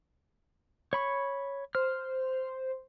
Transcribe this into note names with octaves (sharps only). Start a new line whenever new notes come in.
C#5 B5 C#6
C5 F6